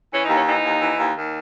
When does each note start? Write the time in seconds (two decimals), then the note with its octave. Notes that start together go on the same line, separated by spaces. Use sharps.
0.11 E3 C#4
0.22 D#4
0.28 D#2
0.34 C#4
0.45 E3 D#4
0.63 D#2
0.80 E3
0.98 D#2
1.16 D#2